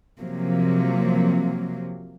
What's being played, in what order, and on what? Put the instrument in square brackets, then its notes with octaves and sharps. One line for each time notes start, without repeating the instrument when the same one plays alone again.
[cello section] C3 F3 F#3 A#3